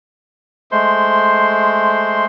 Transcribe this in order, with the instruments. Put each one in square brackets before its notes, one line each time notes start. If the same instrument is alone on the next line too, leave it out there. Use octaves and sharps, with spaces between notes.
[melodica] G#3 A3 C5 C6